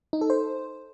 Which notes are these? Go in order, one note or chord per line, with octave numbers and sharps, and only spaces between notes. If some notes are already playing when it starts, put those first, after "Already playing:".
D#4
A4
C5